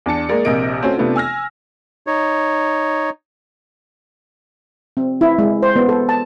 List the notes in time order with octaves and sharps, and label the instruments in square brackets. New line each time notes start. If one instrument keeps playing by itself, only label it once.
[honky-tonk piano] E2 D4 A5 C#7
G#3 A#3 A#4 D5
A#1 C3 A#4 D#5 D7
A3 C4 C#4 F#4
C3 A3 B3 D4 F4
G#5 E6 F6 A#6
[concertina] D#4 C#5
[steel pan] C4
E4
G#3
C5
B3
A4
A5